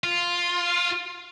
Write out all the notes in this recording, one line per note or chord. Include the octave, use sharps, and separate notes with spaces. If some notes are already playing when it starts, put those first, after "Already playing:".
F4